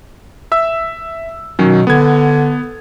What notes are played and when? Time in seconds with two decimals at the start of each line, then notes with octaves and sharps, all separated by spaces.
0.52 E5 E6
1.59 B2 D#3 F#3 C#4
1.87 D3 B3 G#6